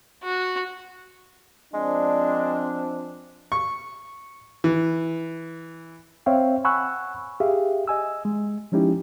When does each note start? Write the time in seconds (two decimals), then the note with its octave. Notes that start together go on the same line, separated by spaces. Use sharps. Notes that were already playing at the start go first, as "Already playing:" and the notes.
0.24 F#4
1.74 F3 G#3 C4 D4
3.52 C#6
4.64 E3
6.26 C4 C5 C#5 E5 F5 G5
6.64 F#5 G#5 B5 C#6 E6 F#6
7.40 G4 G#4 E5 F5
7.87 D#5 G#5 E6
8.25 G#3
8.72 F3 G#3 C#4 D#4 E4 G4